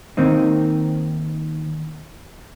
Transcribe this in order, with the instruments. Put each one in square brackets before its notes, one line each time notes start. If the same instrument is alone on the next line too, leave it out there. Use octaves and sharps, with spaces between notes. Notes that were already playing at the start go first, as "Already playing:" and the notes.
[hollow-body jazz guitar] D#3 A#3 C4 D#4